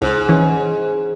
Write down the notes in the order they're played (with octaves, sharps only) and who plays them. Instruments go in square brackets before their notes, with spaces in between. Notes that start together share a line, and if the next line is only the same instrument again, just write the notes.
[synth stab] C#2 [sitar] G#2
[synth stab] E3 C#4